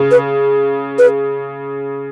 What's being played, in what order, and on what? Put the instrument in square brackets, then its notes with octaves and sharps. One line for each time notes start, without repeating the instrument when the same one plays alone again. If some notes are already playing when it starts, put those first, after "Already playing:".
Already playing: [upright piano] C#3
[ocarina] B4
B4